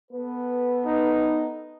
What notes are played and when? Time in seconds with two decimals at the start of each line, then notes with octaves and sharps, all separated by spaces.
0.11 B3 A4 B4
0.86 D#4